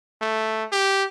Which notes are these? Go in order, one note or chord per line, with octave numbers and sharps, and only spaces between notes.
A3
G4